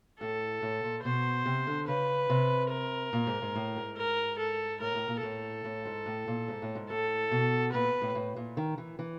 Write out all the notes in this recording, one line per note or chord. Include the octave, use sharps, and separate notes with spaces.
A2 A4
A2
A#2
B2 C5
C3
D3
C#3 B4
C3
A#4
A#2
G#2
G#2
A2
G#2
A#4
A4
A2 A#4
A2
A#2
A2 A4
A2
G#2
A2
A#2
G#2
A2
G#2
A2 A4
B2
A#2 B4
A2
A2
A#2
D#3
E3
E3